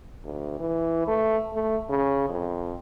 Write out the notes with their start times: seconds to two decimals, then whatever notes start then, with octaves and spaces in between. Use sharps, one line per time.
0.24 D2
0.60 E3
1.07 A3
1.54 A3
1.90 C#3
2.29 F2